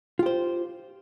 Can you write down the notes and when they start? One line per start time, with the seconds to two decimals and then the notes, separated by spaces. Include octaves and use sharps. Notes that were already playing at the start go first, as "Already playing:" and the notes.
0.19 F4
0.23 G4
0.26 C5